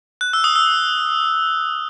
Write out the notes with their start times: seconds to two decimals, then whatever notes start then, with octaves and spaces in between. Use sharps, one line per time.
0.21 F#6
0.33 E6
0.44 D#6
0.56 E6